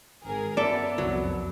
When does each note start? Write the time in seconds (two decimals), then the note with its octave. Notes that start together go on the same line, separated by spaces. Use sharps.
0.23 G#1 G#4 A#4
0.57 F#2 B3 A4 D5 E5
0.98 C2 F2 F#3